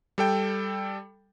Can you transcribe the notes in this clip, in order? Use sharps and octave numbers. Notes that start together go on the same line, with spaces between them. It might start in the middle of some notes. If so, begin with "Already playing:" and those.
G3 A4 G5